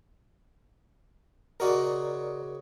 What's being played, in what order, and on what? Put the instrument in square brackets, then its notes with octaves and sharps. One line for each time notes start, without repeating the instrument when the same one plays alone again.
[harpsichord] C#3 F#4 D#5 [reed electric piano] A#4 D5